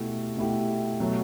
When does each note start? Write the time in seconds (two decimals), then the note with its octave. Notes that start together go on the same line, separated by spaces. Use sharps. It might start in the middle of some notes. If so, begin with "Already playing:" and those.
Already playing: B2 A3 E4 G4
0.37 B2 A3 E4 G4
1.00 B2 F#3 A3